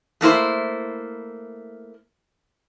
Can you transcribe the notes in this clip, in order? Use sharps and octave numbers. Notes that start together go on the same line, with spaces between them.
A3 A#3 E4 C5